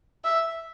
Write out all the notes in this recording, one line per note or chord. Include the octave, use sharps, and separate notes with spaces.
E5